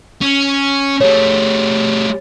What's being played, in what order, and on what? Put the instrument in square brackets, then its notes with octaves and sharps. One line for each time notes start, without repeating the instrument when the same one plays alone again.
[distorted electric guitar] C#4
[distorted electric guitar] G3 A3 [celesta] C#5